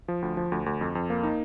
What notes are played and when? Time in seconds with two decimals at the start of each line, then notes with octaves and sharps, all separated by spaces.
0.08 F3
0.22 D2
0.37 F3
0.52 D2
0.66 D2
0.81 F2
0.95 F2
1.10 A#3
1.23 D#4